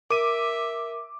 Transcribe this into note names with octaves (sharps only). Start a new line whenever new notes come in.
A#4 E5 D6 D#7